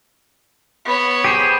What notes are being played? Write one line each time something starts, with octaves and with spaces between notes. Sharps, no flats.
B3 C#5
G4 G#4 C5